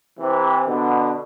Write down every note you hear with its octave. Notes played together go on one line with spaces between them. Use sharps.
C3 E3
B2 D3